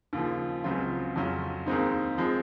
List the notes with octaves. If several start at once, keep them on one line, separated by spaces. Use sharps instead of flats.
D#2 C#3 F3
C#2 C#3 F#3 C4 F4
F2 C#3 F#3 C#4 F4
D#2 D#3 G#3 C4 D#4
F3 G#3 C4